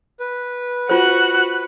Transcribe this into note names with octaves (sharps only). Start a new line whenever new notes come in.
B4
F4 F#4 C5 F#6